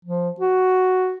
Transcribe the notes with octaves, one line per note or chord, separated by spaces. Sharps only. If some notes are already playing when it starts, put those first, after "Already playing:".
F3
F#4